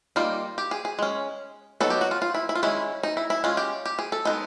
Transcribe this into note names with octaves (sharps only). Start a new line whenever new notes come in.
G3 A#3 D#4 F4
G4
G#4
G#4
G#3 C#4
F#3 B3 D#4 A4
G4
F#4
F4
F4
E4
E4
F4
D#3 G#3 C#4 E4
D#4
E4
E4
G#3 C#4 F4
G4
G4
G#4
A4
G#3 B3 D#4